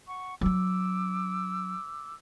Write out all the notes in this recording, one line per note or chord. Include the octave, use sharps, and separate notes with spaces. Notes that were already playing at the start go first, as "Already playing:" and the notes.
F#5 C#6
F#3 D4 D6 E6